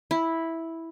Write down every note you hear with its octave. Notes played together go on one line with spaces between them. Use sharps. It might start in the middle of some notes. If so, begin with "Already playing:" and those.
E4